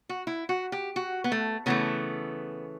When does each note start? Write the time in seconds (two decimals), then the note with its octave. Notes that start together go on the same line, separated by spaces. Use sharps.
0.09 F#4
0.27 E4
0.49 F#4
0.72 G4
0.96 F#4
1.24 B3
1.32 A3
1.66 C#3 E3 A3 B3